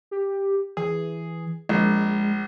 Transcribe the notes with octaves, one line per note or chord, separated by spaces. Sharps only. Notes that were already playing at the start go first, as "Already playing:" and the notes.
G4
E3 G#4
A#1 G#3